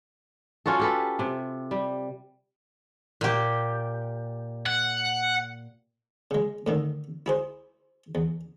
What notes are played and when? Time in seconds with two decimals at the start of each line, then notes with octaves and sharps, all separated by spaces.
0.66 C#4 F4 F#4 A4
0.79 G4 A4 B4
1.19 C3
1.71 G3
3.21 A#2 G4
4.66 F#5
6.31 C#3 G#3
6.67 A2 D3 D#3
7.26 E4 G#4 C5
8.15 E2